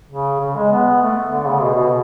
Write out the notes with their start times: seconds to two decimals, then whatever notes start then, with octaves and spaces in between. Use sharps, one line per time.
0.11 C#3
0.41 C#3
0.56 G#3
0.71 B3
1.02 A3
1.31 D3
1.47 C#3
1.62 B2
1.76 B2